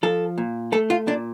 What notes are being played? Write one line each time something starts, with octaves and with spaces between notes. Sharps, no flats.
F3 A4
A#2
A3 A4
F4
A#2 D4